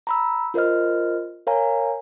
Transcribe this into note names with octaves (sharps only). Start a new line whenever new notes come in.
A#5 B5 E6
F4 A#4 C5 D#5 F6
A#4 C#5 F5 G#5 A#5